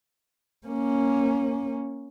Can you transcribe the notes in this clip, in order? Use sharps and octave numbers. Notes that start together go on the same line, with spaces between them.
A#3 C#4